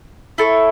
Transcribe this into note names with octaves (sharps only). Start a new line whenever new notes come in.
E4 A4 C#5